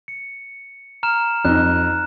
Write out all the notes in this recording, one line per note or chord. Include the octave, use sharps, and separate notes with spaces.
C#7
A#5 F6 E7
F2 D#4 F#6